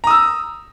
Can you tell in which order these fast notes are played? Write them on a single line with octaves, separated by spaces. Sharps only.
A#5 D#6 E6